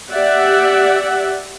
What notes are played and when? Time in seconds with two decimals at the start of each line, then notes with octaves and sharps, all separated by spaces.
0.11 G4 D5 E5 F#5